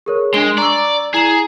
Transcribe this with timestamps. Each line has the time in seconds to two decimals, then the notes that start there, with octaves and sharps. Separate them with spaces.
0.06 G#4 A#4 C#5
0.34 G#3 D4 D7 G7
0.58 D5 A#5 C#6 E6
1.14 E4 G#4 A#5 E7